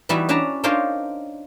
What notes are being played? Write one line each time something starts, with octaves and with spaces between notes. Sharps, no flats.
E3 G3 B3 D#4 E4 F#4
C#4 D4 B4 A5 A#5
D4 D#4 F4 A#4 C5 C#5